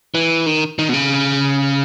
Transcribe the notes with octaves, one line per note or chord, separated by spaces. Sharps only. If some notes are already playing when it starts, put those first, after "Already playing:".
E3
D#3
D#3
B2
C#3